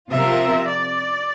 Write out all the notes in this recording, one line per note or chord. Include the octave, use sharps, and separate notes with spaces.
C3 F3 C4 F4 A#4 E5
D5